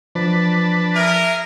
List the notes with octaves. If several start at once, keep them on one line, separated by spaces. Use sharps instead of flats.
F3 D4 B4 A5
G#4 A#4 E5